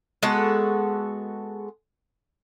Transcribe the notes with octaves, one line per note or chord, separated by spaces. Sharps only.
G#3 B3 F#4 A4